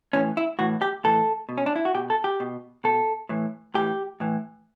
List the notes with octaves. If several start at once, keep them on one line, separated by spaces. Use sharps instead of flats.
A2 E3 C#4
E4
A2 E3 F#4
G4
A2 E3 A4
B2
C#4
D4
E4
F#4
B2 G4
A4
G4
B2
B2 A4
A2 E3
A2 E3 G4
A2 E3